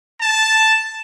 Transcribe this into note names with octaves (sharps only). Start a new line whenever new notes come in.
A5